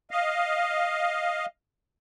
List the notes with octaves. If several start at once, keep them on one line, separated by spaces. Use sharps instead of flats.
D#5 F5